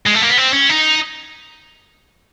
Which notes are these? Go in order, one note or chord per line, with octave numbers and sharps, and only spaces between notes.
G#3
A3
A#3
B3
C4
C#4
D#4